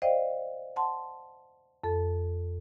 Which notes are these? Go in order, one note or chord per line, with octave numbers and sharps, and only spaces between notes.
C5 D5 D#5 F5 G5
F#5 A5 C6
F2 A4